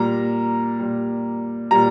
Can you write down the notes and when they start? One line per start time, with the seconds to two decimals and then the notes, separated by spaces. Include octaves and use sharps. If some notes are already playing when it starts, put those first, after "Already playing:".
Already playing: A#2 G3 A#5
0.79 A#2 G3
1.71 A#2 G3 A#5